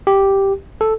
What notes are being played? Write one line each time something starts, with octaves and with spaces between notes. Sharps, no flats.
G4
A4